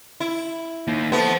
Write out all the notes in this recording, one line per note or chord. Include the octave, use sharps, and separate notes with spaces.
E4
A#3 D#4
A3 B3 C5 A5